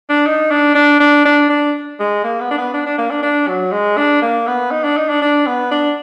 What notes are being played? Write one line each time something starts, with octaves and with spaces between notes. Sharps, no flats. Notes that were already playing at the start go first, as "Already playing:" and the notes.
D4
D#4
D4
D4
D4
D4
D4
G#3
A#3
B3
D4
B3
D4
D4
A#3
D4
D4
F#3
G#3
D4
A#3
B3
D#4
D4
D#4
D4
D4
B3
D4